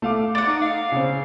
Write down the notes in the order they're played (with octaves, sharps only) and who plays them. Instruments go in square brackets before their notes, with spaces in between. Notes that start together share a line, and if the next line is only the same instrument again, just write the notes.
[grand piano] A3 F5 D6
[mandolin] D5 F#5 [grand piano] A6
[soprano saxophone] D#4
F5
[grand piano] C#3 C4